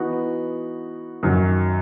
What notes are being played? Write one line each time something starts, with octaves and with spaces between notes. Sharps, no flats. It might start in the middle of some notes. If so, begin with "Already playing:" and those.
Already playing: E3 B3 D#4 F#4
F#2 D#3 F#3